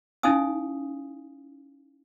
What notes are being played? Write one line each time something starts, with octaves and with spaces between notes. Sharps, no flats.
C#4 D#4 E4 F5 G#5 D#6